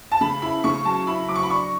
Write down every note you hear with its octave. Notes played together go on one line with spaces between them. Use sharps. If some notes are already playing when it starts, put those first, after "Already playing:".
A5
C#3 B5
E4 B5
C#3 C#6
F#3 A5
E4 B5
F#3 D6
C#6
B5
D4 C#6